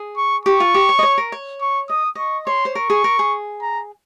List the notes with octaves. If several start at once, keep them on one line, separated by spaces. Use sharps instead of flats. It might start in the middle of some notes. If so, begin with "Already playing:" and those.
Already playing: G#4
C#6
G4 C#6
F4
G4
C#5
D#5
C#5
A#4
C#5
C#6
D#5 D#6
D#5 C#6
C#5 C6
C5
A#4 C#6
G#4
A#4
G#4
A#5